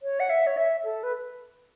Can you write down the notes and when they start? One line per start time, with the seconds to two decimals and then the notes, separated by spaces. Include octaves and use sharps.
0.03 C#5
0.20 F#5
0.30 E5
0.47 C#5
0.57 E5
0.84 A4
1.03 B4